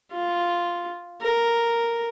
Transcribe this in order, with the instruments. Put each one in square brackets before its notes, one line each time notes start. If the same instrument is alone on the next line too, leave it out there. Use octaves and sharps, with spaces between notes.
[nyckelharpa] F4
A#4